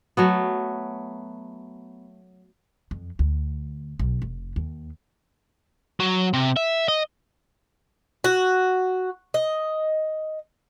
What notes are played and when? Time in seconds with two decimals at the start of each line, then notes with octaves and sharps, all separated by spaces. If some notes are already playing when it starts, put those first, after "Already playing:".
0.17 F#3 A3 B3
2.91 F2
3.19 D2
3.99 B1
4.22 F1
4.56 D#2
6.00 F#3
6.33 C3
6.56 E5
6.88 D#5
8.24 F#4
9.34 D#5